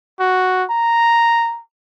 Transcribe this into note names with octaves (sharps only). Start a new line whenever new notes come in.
F#4
A#5